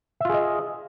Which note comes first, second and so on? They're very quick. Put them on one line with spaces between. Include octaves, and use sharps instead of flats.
E5 F4 G#4 D#5